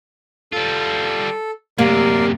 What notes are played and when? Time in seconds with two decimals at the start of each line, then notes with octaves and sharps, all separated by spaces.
0.53 G3 F4 A4
1.78 F#2 C3 A#3 G4 A#4 D5 C6